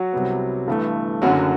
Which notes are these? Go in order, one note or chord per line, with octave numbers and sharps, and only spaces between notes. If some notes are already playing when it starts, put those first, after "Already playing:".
Already playing: F#3 F#4
C2 C3 G3 B3
G1 G2 E3 A3
F#1 F#2 D3 F#3 F#4